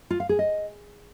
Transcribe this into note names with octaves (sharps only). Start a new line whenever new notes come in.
F4
F5
G#4
D#5